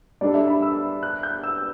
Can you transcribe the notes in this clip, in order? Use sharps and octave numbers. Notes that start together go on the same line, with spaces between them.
G3 D4 A4 D5
E5
B5
E6
F#6
G6
E6